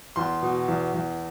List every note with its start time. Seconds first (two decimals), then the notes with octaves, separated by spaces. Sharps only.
0.16 E2 C6
0.42 B2
0.68 E2
0.94 E2